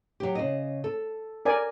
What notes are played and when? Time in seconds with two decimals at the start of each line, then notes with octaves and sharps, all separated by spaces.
0.20 F#3 G4
0.35 C#3 D#5
0.84 A4
1.45 A#4 D5 G#5